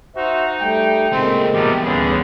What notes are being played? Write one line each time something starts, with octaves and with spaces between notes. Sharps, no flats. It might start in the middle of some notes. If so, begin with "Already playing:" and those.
D#4 F#4 C5 E5
G3 A3 G5
A#2 C#3 G#3 A3 C4
E2 G2 C3 F3 G3 G4
D2 D3 C#4 G#4 B4